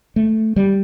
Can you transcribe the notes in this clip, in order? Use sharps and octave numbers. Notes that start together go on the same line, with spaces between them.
A3
G3